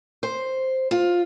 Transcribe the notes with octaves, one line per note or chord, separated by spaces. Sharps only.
C5
F4